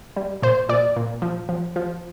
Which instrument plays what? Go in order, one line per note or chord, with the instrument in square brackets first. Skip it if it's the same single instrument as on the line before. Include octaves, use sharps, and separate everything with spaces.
[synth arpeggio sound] G3
A#2 C5
A#2 D5
A#2
F3
F3
F3